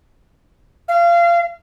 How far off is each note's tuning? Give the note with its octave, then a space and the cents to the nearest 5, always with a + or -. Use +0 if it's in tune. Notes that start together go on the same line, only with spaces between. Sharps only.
F5 -30